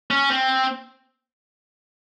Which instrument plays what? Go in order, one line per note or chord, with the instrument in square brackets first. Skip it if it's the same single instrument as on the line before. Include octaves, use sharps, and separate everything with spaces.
[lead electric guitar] C#4
C4